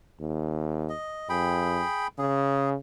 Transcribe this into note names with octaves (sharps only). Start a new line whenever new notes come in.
D#2
D#5
F2 G#4 G5 B5
C#3 G#4